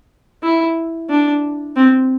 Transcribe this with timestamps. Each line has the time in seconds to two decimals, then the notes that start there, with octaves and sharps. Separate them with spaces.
0.43 E4
1.09 D4
1.76 C4